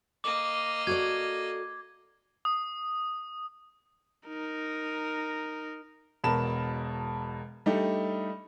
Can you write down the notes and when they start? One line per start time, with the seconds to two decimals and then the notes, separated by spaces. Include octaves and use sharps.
0.24 A#3 D#5 D6
0.87 F#4 A4 D5 G#6
2.45 D#6
4.27 D#4 A#4
6.24 E1 B2 A#4 A5 B5 E7
7.66 G3 A3 D4 D#4